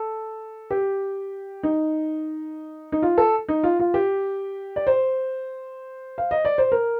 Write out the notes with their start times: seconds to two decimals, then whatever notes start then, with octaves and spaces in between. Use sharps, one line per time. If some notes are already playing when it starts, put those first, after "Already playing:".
Already playing: A4
0.71 G4
1.63 D#4
2.92 D#4
3.02 F4
3.18 A4
3.48 D#4
3.63 F4
3.80 F4
3.94 G4
4.76 D5
4.87 C5
6.18 F5
6.31 D#5
6.45 D5
6.58 C5
6.72 A#4